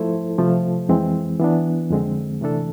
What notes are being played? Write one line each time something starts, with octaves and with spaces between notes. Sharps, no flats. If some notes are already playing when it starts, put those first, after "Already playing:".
Already playing: F3 A3 E4 A4 C5
C3 F3 A3
F2 E3 G#3 C4
E3 B3 D4
F2 D3 G#3 C4
C3 E3 A3 D4 A4